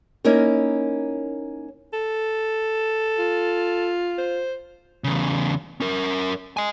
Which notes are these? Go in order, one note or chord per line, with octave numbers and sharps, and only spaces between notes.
A#3 C#4 D#4 E4 A#4
A4
F4
C5
E2 C#3
C#4 A#4
D#5 G#5